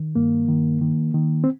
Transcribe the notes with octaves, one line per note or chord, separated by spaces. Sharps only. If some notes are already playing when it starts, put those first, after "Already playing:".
Already playing: D#3
G2 A#3
D#3
D#3
D#3
C4